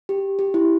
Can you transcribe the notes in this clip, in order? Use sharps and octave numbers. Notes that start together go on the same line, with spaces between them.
G4
G4
E4